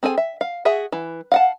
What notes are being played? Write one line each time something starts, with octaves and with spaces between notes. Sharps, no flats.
C4 G#4 A4 G#5
E5
F5
F#4 G#4 E5
E3
F5 F#5 A5